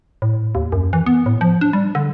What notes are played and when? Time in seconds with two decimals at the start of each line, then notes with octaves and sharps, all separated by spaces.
0.22 A2
0.55 D#2
0.72 F#2
0.93 E3
1.06 B3
1.26 A2
1.41 F3
1.61 D4
1.73 G3
1.95 D3